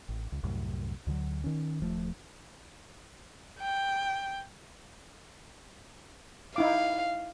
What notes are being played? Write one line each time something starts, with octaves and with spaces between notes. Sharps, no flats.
A1
C#2
C2 F#2 A2
D2 D3 E3 F#3
D#3 C#4
D#1 F3 A3
G5
D#4 E4 F5 D6